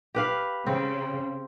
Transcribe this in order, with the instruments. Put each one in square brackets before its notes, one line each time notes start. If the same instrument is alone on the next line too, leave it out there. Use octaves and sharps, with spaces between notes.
[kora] G4 B4 F5
[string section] C#3 [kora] C4